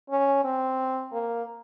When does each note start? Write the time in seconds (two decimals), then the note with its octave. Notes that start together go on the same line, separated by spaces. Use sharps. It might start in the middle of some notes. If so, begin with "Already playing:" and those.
0.10 C#4
0.44 C4
1.13 A#3